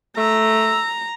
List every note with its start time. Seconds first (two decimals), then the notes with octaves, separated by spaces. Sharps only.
0.18 A3 A#5 E6